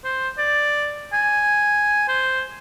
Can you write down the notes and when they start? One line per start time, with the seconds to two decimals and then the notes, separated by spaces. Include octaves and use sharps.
0.05 C5
0.38 D5
1.13 G#5
2.08 C5